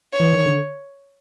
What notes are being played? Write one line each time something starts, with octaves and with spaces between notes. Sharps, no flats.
C#5
E3
D#3
D3